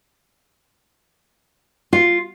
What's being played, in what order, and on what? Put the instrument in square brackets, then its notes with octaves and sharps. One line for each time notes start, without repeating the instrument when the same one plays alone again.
[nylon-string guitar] F4